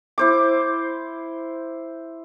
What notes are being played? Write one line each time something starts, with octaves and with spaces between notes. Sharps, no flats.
E4 C5 D6